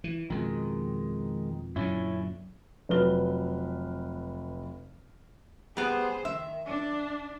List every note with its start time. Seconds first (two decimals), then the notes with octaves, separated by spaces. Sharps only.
0.04 E3
0.30 F2 B2 D#3 G#3
1.76 F#2 A#2 D3 C#4 E4
2.89 F1 F#3 B4 F6 G7
5.77 G3 B3 G#4 C5
6.25 D#3 E5
6.65 D4